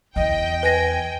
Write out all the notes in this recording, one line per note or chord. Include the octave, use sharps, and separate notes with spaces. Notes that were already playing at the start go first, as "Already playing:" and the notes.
E2 D#5 G5
B4 G#5 A#6